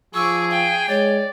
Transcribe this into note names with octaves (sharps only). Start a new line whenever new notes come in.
F3 G#4 C#6 D6 E6
F5 G5
G#3 C#5 D5